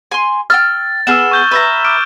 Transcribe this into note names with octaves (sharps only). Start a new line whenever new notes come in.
G#5 C6
G5 E6 F6 A6
B3 G#4 E6 F6 E7
C#6 G6 G7
B4 E5 A#5
D6 F6 D7